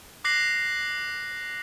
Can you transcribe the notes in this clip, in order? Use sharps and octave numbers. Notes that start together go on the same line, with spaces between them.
D6 F#6 A#6 C7 F#7